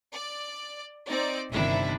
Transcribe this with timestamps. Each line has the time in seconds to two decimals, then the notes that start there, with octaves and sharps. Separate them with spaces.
0.12 D5
1.08 C4 D#4 D5
1.50 G1 C3 D#3 D4 E4 E5